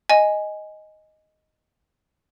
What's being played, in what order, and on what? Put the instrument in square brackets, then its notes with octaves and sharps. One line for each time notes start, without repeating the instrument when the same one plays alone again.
[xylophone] D#5 G#5